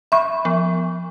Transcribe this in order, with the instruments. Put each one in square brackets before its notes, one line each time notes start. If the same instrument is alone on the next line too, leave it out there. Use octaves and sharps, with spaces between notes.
[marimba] E5 C#6 [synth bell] B5
[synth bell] F3 B3